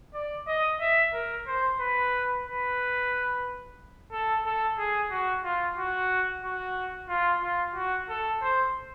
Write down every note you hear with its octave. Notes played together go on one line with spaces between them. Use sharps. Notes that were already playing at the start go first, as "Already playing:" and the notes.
D5
D#5
E5
A#4
C5
B4
B4
A4
A4
G#4
F#4
F4
F#4
F#4
F4
F4
F#4
A4
C5